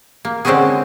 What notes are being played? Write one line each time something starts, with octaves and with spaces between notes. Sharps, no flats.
A#3
D3 G#3 C4 C#4 F#4 G#4